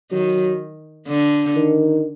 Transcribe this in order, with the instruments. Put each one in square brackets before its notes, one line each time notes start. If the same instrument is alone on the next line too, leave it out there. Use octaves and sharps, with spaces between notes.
[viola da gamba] D#3 [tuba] F#3
[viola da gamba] D3
[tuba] D#3